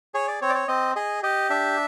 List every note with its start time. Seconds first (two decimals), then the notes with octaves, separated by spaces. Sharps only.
0.14 G#4 C#5
0.28 D5
0.42 C4 C#5
0.49 D5
0.55 C#5
0.68 C4 D#5
0.95 G#4 D#5
1.23 G4 D#5
1.50 D4 E5